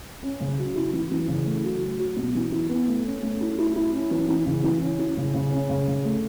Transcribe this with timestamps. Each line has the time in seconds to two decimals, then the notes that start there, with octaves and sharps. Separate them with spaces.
0.23 C#4
0.40 C#3
0.59 F#3
0.76 E4
0.93 E3
1.11 E3
1.28 C#3
1.46 A3
1.64 F#3
1.82 F#3
1.99 F#3
2.16 B2
2.35 E3
2.52 E4
2.69 B3
2.88 A3
3.05 C#4
3.23 A3
3.41 E4
3.59 E4
3.76 E4
3.93 C#4
4.11 E3
4.28 E3
4.46 C#3
4.64 E3
4.82 C#4
4.99 E4
5.17 C#3
5.34 C#3
5.52 C#4
5.70 C#3
5.88 C#3
6.05 A3